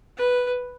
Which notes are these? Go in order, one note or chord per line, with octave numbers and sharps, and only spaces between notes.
B4